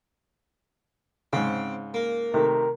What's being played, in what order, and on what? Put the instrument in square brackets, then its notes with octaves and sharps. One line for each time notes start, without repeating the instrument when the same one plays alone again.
[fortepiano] G#2 C#3 [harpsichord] C4
[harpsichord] A#3
[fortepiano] C3 D#3 A3 [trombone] A#4